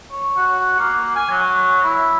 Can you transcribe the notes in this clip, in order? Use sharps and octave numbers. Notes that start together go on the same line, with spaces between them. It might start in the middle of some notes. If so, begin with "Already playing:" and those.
C#5
F#4
A#3
G#5
F#3
E4